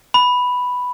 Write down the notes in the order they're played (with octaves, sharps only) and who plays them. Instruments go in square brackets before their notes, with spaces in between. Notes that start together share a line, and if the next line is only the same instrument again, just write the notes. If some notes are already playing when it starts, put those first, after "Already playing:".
[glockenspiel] B5